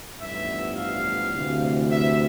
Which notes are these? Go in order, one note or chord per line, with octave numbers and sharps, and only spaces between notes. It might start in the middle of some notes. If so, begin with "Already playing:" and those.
A1 G2 F3 B3 E5
F5
D2 C3 E3
E5